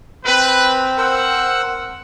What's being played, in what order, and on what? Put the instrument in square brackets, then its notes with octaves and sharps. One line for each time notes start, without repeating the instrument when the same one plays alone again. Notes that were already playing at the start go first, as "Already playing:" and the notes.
[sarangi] C4 [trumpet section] B4
[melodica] A#4 C5 E6 [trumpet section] F#5